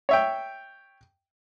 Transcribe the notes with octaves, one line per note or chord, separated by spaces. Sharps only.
C#5 E5 G5